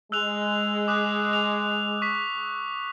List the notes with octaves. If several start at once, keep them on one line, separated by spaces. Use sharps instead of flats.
G#3 E6 F#6 F7
D6 D#6 F#6
F7
C#6 B6